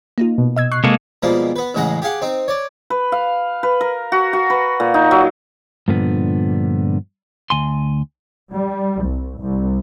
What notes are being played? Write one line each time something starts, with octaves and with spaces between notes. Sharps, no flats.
A#3 D#4 F4
B2
D#5 E6 G#6
C#6 F#6 C7
C3 G#3 A#3 A4
B2 F3 G3 G#3 A#3
B3 B4
A1 A2 C#3 G#3 F#5 A#5
G4 G#4 F5 F#5
C4 D#4
C#5 D5
B4
F5
B4
A#4
F#4
F#4
B4
A#2
D#4
F#3
G2 A#2 D3 F3 B3
D2 G#5 C6
G3
C2
C2